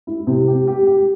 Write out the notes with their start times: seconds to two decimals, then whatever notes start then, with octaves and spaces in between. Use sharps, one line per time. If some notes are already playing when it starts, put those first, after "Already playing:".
0.07 E4
0.27 C3
0.47 G4
0.67 G4
0.86 G4